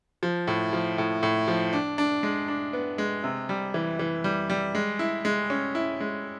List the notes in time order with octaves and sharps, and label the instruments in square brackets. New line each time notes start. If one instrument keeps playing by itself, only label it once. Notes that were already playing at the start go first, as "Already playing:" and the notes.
[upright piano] F3
A2
F3
A2
A2
F3
D4
D4
G#3
D4
B3
G#3
C3
G3
E3
E3
G3
G3
G#3
E4
G#3
C#4
E4
G#3